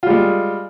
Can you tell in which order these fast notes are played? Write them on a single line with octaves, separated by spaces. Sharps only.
F4 G3 G#3